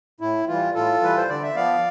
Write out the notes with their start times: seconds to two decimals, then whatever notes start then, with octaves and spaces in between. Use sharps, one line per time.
0.20 A2 E4
0.48 E3 G3 F4
0.74 A2 F4 A4
1.02 E3 G3 B4
1.17 C5
1.28 D3 D5
1.43 E5
1.55 F3 B3 D5 F5